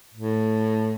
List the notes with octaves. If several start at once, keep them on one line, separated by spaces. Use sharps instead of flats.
A2